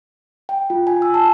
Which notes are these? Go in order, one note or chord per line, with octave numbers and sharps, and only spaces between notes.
G5
F4
G#5
E6
A5